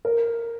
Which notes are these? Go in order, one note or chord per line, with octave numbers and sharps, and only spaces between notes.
A#4